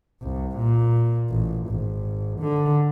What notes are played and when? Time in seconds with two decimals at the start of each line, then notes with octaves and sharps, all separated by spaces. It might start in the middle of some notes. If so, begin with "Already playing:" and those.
0.22 C2
0.58 A#2
1.30 A1
1.69 G#1
2.40 D3